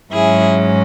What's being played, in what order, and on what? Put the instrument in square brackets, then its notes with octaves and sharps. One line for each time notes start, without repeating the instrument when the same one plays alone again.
[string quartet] G#2 F#3 C#4 E4 G#4